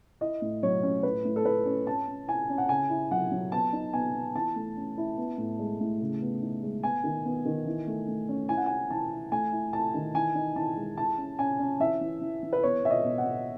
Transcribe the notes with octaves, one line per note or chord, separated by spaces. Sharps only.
E4 D#5
A2
F#3 C#5
C#4
A2 B4
A2
A4
A2 B4
C#4
C#4 A5
C#4
E4 G#5
C#4
F#5
C#3 G#5
E4
F#3 F#5
F#3
B3 A5
D#4
B3 G#5
B3
E3 A5
A3
C#4
E4
B3
A2
G#3
A2
C#3
B3
D#4
G#3
B3 G#5
D#3
B3
D#3
E3
A3
A3
C#4
E4 G#5
F#5
E4 G#5
E3 A5
E4
A3 G#5
E4
E4 A5
D#3
E3 G#5
D#4
E3 A5
G#3
E4 A5
C#4
C#4 G#5
C#4
E3 E5
E3
E3
E3
B4
B3 C#5
B2 E5
D#5
B2
F#5
B2